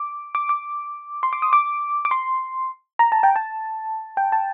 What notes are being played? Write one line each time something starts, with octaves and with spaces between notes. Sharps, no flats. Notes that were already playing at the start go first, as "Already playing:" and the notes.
Already playing: D6
D6
D6
C6
D6
D#6
D6
D6
C6
A#5
A5
G5
A5
G5
A5